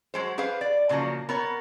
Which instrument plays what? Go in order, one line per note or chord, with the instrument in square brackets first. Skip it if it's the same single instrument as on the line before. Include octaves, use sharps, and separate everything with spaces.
[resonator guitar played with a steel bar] F#3 G#3 C5
G4 G#4 B4 C5 F5
D5
A#2 C#3 F3 F#3 A#3
B3 A#4 C#5